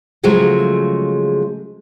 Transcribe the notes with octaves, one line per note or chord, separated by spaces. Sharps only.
C#3 F3 F#3 G#3 A3